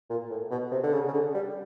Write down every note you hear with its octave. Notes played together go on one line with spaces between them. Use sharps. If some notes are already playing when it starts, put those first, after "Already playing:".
A#2
A2
B2
C3
D3
C#3
C#3
D3
G3